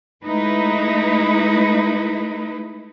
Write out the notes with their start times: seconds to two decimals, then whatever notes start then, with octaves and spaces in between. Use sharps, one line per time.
0.24 G#3 A3 D#4 E4 B4